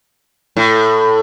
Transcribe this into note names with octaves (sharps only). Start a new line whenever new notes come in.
A2